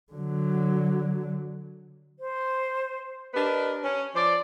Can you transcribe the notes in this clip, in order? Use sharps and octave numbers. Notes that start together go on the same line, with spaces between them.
D3 F#3
C5
D4 G4 A#4 B4 D#5
C#4
F3 C5 D5